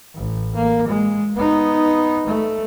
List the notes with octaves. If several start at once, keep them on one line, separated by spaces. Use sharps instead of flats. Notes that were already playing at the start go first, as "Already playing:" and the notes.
A1
A#3
G#3
B3 D#4
A3